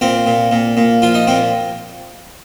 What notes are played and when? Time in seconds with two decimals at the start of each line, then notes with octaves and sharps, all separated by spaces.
0.01 A#2 C4
0.26 A#2
0.51 A#2
0.77 A#2
1.02 F3 F4
1.14 D#4
1.27 A#2 C4